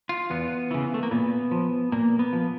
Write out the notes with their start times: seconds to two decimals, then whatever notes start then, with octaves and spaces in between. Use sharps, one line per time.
0.09 F4
0.30 E2 B3
0.71 C#3 E3
0.94 A3
1.03 A#3
1.11 A#2 B3
1.51 F3
1.92 A#2 A#3
2.19 B3
2.33 F3